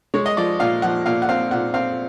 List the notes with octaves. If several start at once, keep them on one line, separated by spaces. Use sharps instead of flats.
G#3 C#5
D#5
F3 D5
A#2 F5
F3 F#5
A#2 F5
F#5
C4 F5
A#2 F#5
C4 F5